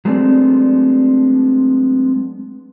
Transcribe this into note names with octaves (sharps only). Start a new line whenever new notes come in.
F#3 G#3 A3 B3 C4 D4